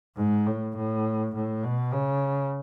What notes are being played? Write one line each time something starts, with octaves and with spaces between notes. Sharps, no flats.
G#2
A2
A2
A2
B2
C#3